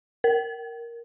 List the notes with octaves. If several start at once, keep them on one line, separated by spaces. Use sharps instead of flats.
A#4